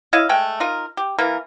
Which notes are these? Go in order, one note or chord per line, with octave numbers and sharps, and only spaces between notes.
E4 C#5 D#5 F5
G#3 A3 G5
D#4 F4 A#4
G4
E3 A#3 A#4